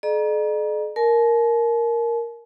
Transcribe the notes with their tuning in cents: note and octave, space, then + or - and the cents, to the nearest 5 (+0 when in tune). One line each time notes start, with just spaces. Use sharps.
A4 -45 D5 +45 A#5 +30
A#4 +0 A5 -45